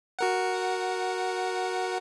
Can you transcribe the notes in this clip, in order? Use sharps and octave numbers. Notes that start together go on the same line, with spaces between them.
F#4 A#4 F#5